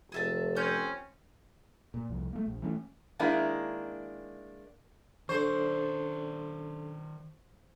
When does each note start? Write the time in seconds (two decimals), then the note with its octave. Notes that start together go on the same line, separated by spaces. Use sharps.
0.12 F1 G#4 E5 A5
0.57 C4 C#4 G6
1.94 A#2
2.09 C2 F2
2.33 A3 A#3
2.46 A#1
2.62 E3 A3 A#3 C#4
3.19 D#3 G#3 A#3 D4 E4
5.29 D#3 D4 A4 C5 D5 C#6